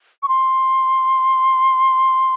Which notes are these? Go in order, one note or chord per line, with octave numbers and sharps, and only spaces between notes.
C#6
C6